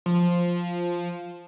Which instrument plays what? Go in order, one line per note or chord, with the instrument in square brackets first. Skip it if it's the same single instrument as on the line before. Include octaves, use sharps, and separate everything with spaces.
[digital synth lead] F3